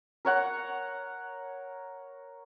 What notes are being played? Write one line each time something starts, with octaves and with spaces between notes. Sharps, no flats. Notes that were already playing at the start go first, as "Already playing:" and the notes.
A#4 C#5 F#5 C#6